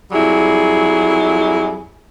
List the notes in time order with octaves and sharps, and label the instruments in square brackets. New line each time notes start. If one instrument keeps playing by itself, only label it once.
[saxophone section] F2 F#3 G3 E4 G#4